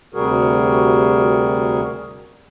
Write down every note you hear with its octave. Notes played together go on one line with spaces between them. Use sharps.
D2 C3 G3 F#4 G#4 A#4